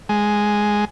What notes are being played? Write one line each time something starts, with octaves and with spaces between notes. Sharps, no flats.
G#3